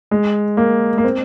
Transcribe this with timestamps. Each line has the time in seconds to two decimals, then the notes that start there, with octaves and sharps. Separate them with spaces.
0.11 G#3
0.57 A#3
0.98 A#3
1.04 C4